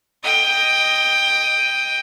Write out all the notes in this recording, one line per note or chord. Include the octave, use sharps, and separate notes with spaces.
D#5 G5